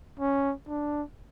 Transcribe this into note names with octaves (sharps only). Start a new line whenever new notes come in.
C#4
D4